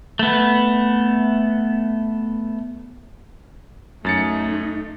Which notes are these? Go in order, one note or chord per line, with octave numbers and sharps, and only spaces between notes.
A3 B3
F#2 A3 D#4 A6 C#7